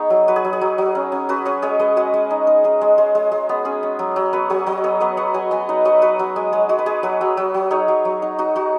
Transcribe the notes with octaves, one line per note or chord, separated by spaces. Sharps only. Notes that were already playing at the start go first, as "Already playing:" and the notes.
Already playing: B3 D#4 G#4 C#5
F#3
F#3 F#4 B4
G#4
F#3
G#4
F#3
F#3
C#4
C#4
C#4 F#4 B4
C#4 G#4 C#5
G#3 G#4 C#5
G#3 B4 D#5
G#3 F#4 B4
G#3
D#4
D#4
D#4 G#4
G#3
G#3
G#3
G#3
B3
C#4 G#4
C#4
F#3
F#3
B3 F#4 B4
F#3 G#4 C#5
F#3 B4 D#5
B3 G#4 C#5
B3 B4 D#5
B3 C#5 F#5
F#3 D#5 G#5
B3 D#5 G#5
D#4 C#5 F#5
F#3 B4 D#5
F#3 F#4 B4
F#3
G#3
G#3
G#3 F#4
B4
G#3 G#4
F#3 F#4 B4
F#3
F#3
F#3
D#4 G#4 C#5
F#3
F#3
D#4
D#4 F#4
D#4 F#4